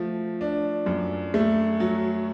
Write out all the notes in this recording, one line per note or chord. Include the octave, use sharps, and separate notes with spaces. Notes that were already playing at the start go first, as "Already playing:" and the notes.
Already playing: F3 A3
D4
F#2
A3
F#3